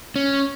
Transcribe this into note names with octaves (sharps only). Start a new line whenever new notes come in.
C#4